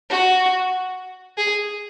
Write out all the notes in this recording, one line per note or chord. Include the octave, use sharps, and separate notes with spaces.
F#4
G#4